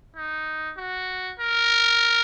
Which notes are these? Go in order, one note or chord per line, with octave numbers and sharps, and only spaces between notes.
D#4
F#4
A#4